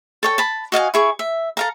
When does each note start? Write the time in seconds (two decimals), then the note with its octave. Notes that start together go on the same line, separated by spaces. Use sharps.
0.23 A4 C#5 G5
0.38 A5 B5
0.72 F#4 D#5 F5 G#5
0.94 E4 G#4 C#6
1.19 E5
1.57 A4 F5 A#5